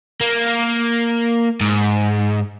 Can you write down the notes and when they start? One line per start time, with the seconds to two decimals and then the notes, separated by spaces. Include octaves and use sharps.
0.21 A#3
1.61 G#2